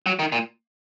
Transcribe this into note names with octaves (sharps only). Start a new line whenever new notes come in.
F#3
D#3
A#2